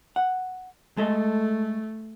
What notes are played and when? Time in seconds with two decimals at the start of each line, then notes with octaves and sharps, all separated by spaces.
0.16 F#5
0.97 G#3 A3 A4 D#5